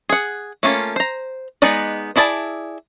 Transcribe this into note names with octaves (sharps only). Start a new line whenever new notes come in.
G#4 F#5
A3 A#3 C#4 F4
C5 A#5
G#3 B3 D#4 D5
D4 E4 G#4 D5 A5